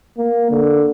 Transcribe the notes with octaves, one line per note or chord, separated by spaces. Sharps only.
A#3
D3